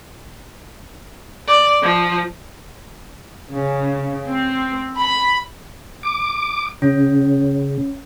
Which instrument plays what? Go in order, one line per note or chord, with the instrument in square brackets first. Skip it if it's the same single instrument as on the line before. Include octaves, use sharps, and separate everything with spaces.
[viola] D5
F3
[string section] C#3
C4
B5
[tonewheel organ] D6
[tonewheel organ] C#3 [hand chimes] C#4